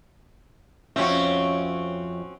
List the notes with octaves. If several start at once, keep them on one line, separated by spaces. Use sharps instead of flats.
F2 G#2 C4 C#4 F#4 E5